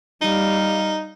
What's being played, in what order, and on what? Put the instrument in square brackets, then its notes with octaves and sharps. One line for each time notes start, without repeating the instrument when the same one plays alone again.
[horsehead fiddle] G3 F5 [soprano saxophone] D#4